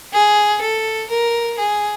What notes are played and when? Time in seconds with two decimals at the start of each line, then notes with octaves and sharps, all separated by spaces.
0.12 G#4
0.61 A4
1.09 A#4
1.58 G#4